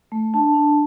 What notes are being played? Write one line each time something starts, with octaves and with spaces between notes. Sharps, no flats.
A3
D4 A5
D4